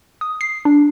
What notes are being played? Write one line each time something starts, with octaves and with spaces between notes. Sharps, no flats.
D#6
C7
D4